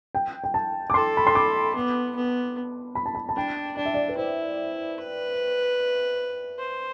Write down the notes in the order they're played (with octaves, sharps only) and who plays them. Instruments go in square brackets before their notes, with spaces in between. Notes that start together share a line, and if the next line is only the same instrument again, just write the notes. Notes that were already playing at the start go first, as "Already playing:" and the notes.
[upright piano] G5
G5
A5
D6
[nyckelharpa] A4 [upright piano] C6
[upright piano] B5
C6
D6
[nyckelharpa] B3
B3
[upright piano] B5
A5
B5
A5
[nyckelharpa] D4 [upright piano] G5
[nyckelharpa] D4 [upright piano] D5
[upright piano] E5
D5
B4
[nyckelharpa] E4 [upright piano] C5
[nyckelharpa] B4
C5